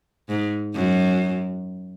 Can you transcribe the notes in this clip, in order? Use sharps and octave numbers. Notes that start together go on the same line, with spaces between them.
G#2
F#2